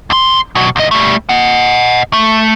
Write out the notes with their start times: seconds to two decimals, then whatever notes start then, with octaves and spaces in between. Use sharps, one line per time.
0.10 D#2 C6
0.55 B2 F#3
0.76 C2 D#5
0.91 G3 A3
1.29 D#5 F#5
2.13 A3